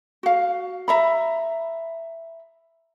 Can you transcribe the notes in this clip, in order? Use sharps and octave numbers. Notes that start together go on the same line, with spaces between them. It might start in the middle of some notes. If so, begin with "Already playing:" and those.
F#4 F5
E5 A#5 B5